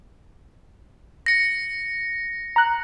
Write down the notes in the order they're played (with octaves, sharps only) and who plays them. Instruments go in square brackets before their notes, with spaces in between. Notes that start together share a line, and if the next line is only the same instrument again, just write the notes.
[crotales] A#6 C#7
[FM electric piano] A#5 F#6